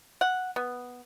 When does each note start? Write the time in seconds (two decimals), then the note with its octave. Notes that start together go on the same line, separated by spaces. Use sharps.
0.21 F#5
0.56 B3